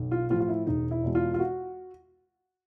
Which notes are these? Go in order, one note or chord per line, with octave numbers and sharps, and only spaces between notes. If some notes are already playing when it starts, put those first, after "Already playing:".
Already playing: B1
F4
A2 F3 F4
F4
E4
E1 D#4
E4
E2 B2 G#3
F4
F4
F#4